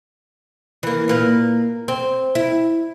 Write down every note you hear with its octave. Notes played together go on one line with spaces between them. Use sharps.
E3 A#3
A#2 A#3 B4
C4
E4